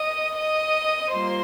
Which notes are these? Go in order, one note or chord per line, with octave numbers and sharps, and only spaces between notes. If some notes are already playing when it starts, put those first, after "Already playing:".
Already playing: D#5 D#6
D#5 D#6
G3 A#3 F4 C5 C6